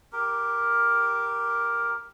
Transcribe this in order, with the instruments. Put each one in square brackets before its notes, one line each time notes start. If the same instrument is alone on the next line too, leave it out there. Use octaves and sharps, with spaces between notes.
[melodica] G4 A#4